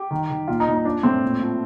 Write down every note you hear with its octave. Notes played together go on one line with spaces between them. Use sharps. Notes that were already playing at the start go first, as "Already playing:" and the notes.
Already playing: G4
D#3
D#3
A#2 F4
D#4
A#2
D#4
F3 D4
A2 C4
A#2
F3